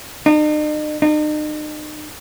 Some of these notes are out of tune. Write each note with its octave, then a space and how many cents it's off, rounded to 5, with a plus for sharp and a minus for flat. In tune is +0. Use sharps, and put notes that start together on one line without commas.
D#4 -45
D#4 -40